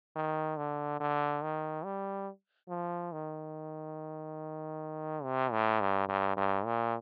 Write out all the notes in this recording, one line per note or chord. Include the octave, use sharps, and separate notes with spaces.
D#3
D3
D3
D#3
G3
F3
D#3
C3
A2
G2
G2
G2
A#2